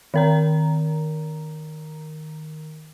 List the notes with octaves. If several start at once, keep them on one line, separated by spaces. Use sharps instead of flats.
D#3 A#4 A#5